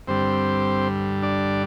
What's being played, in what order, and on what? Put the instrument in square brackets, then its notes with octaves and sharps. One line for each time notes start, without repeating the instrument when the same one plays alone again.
[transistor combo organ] G2 D3 G3 C4 C5
D4 D5